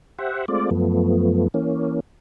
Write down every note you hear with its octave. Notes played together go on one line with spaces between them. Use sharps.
G4 C5 E5 F#5
G#3 A3 C4 F4 D5
F#2 F3 A3 B3
E3 A#3 C#4